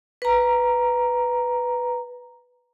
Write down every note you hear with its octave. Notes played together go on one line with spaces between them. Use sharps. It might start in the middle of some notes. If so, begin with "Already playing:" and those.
B4 A#5